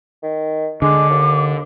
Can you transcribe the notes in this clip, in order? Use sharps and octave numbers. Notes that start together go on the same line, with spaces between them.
D#3
D3 G#3 D6
D#2